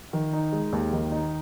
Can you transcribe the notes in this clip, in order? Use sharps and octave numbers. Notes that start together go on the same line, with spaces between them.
D#3
D#4
G#3
D#2
D#3
D#4